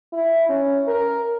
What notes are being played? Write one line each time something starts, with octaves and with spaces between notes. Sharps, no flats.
E4
C#4
A#4